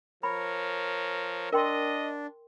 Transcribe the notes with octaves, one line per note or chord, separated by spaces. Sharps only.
F3 A#4 C#5 B5
D4 A#4 D#5 G5 C6